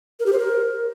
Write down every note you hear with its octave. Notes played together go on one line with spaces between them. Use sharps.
A#4
G4
C5
A#4